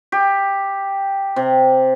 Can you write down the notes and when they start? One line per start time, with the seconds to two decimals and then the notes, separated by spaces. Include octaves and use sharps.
0.12 G4
1.36 C3